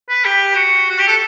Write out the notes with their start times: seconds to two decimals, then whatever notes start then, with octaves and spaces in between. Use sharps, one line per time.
0.09 B4
0.25 G4
0.55 F#4
0.90 F#4
0.98 G4
1.07 A4